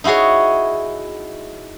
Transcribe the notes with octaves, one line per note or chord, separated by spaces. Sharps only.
D#4 E4 F#4 G#4 C#5